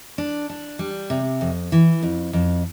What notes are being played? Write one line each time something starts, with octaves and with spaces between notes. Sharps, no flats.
D4
D4
G3
C3
F2
E3
F2
F2